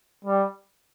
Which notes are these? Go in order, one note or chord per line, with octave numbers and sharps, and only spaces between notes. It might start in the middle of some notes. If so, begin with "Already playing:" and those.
G3